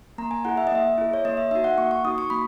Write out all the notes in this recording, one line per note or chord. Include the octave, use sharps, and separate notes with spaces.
A#3 A#5
G#5
E4 G#4 F#5
E5
D#5
A#3 E5
E4 G#4
C#5
A#3 D#5
E5
D#4 F#4 E5
F#5
A#3 C#6
C#6
D#4 F#4 D#6
C#6
A#3 B5